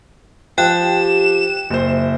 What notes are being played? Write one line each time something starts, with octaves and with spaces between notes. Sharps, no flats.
F3 G4 G5 F#6 E7
F#1 C5 E5